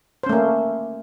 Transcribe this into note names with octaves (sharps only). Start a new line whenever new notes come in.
A3 A#3 C#4 C5